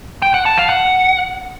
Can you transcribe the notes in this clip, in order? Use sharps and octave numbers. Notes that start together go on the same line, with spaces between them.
G5
F#5
A5
F5
F#5